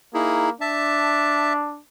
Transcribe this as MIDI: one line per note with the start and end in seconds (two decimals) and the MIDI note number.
0.14 0.53 58
0.14 0.50 63
0.14 0.50 64
0.14 0.50 68
0.61 1.80 62
0.61 1.53 76
0.61 1.53 81